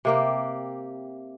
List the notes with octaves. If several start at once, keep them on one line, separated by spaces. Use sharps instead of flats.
C3 A#3 G4